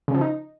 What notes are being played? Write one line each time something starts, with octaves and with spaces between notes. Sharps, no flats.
C#3
F3
D#4